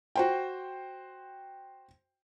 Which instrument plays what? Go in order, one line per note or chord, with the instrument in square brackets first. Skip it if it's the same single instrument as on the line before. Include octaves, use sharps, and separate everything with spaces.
[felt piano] F#4 C5 G5